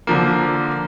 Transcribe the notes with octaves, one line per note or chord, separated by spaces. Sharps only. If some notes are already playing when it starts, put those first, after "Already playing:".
D3 F3 A#3